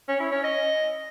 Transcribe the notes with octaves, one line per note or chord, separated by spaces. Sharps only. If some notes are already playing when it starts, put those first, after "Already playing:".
C#4
E4
C#4
D#5